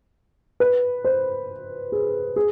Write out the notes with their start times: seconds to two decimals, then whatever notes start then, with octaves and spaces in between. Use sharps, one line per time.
0.60 B4
1.05 C5
1.92 G#4
2.36 G#4